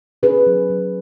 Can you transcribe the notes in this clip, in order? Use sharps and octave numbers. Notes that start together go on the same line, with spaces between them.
C#4 G#4 B4
F#3
F#3